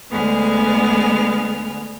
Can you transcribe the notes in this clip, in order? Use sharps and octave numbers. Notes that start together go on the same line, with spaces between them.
D2 D3 G#3 B3 G#4 F6